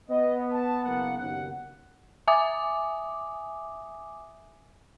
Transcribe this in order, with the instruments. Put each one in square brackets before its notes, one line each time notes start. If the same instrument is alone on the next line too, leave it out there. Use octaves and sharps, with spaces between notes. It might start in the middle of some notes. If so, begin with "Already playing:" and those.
[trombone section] B3 [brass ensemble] D#5
[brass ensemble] A5
F#1 A#3 F#5
F#1 D#2 F#5
[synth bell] E5 G#5 D6 D#6